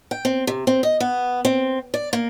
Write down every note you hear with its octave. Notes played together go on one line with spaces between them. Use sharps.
G5
C4
C3
C4
D#5
B3
C4
D5
A#3